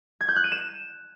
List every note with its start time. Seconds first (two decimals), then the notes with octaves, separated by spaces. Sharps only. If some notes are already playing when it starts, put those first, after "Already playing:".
0.21 G#6
0.28 G6
0.36 F#6
0.44 D#7
0.52 E7